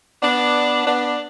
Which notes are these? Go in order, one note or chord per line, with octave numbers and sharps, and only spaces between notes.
B3 D4
B3 D4